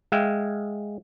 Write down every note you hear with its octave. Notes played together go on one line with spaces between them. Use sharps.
G#3 E5 F5 G5